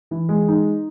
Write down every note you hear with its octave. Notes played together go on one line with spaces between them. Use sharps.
E3
G#3
D#4